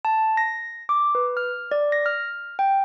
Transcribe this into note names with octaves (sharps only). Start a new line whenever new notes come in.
A5
A#6
D6
B4
F6
D5
A#6
F6
G5